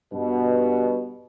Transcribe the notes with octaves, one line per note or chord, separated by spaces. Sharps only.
G2 B2